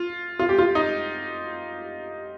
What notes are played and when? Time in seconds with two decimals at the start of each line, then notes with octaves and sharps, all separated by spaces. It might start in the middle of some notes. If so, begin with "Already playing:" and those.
Already playing: F4
0.40 F4
0.49 G4
0.59 F4
0.75 D#4